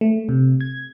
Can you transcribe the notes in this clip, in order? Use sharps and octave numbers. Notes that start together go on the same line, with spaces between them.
A3
C3
G#6